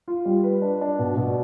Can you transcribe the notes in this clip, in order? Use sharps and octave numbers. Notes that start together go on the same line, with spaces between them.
F4
G3
B4
D4
D4
B2
B2